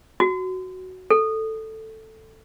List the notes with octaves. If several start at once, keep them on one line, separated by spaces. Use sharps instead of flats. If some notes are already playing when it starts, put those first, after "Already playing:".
F#4
A4